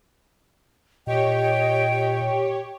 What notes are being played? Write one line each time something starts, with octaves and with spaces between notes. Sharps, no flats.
A#2 G4 C#5 D#5 G5